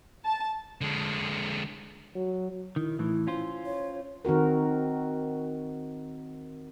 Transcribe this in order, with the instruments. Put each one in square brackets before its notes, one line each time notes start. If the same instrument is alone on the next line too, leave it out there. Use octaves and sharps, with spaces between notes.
[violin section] A5
[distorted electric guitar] D3 G#3
[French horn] F#3
[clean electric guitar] D#3 [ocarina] E4
[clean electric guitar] A2 E3
C#4 F4 C5
[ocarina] C#5
[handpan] D#3 C4 F#4 A#4